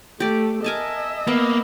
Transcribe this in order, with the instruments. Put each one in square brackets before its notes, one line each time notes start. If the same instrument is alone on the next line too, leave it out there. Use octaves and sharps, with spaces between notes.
[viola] A3 [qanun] G4 D5
[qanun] A#4 G#5 A5 [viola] D#5 E5
[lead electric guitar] A#3 [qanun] B3